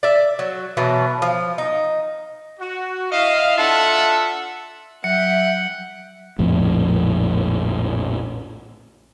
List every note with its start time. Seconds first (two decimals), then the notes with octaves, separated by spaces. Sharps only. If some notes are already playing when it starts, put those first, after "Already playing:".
0.03 D5 E5
0.39 F#3
0.77 B2 E3 F#3
1.22 F3
1.58 D#4
2.59 F#4
3.11 E4 D#5 F5
3.56 D4 F4 A4 E5 F#5
5.04 F#3 E5 F#5 G5 C#7
6.39 A#1 F2 A2